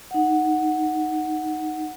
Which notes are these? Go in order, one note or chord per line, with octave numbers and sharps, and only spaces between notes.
D#4 F#5